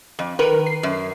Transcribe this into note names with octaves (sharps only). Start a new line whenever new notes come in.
F2
D#3 A#4 B4
C7
F#2